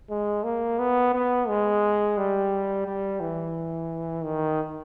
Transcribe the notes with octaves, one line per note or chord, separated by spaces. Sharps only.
G#3
A#3
B3
B3
G#3
G3
G3
E3
D#3